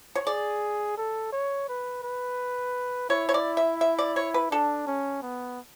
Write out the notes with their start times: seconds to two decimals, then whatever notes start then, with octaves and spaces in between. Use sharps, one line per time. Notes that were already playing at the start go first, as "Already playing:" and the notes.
0.15 C#5
0.27 G#4 D5
0.98 A4
1.32 C#5
1.69 B4
2.03 B4
3.10 E4 C#5
3.29 C#5
3.34 D5
3.57 E5
3.81 E5
3.99 D5
4.16 C#5
4.34 B4
4.51 D4 A4
4.87 C#4
5.23 B3